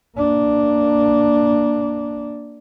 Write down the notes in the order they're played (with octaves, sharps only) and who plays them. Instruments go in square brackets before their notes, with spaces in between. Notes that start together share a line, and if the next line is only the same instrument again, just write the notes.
[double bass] A#3 D4